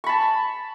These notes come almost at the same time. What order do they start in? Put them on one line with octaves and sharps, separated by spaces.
C#6 B5 A5